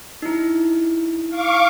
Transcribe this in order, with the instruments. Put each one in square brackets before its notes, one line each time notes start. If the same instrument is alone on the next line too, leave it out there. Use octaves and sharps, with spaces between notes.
[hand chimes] D#4 E4
[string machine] F5 C#6 D6